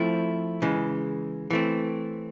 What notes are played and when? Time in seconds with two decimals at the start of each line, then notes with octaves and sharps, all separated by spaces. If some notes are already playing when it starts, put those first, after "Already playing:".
Already playing: F3 A3 C4 E4
0.62 C#3 E3 G#3
1.50 E3 A3 C4